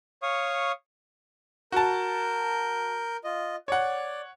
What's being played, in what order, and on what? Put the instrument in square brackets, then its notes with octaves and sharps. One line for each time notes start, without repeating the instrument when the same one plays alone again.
[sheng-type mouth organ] C#5 F5 C#6 D#6
[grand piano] F#4 A5 [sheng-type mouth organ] A#4 G6
[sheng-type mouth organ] F4 D#5
[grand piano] C#5 F#5 [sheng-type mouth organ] D5